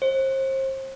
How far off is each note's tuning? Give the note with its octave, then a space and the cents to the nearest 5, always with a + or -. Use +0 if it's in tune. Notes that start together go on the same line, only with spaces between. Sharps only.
C5 +35